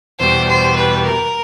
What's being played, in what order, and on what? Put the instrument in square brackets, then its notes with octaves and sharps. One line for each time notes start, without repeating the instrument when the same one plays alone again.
[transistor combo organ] E2 B2 G3 [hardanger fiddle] C5
[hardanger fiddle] C5
B4
A#4